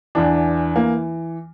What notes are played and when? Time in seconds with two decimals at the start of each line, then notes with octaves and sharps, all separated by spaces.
0.15 E2 E3 D4
0.75 E3 A#3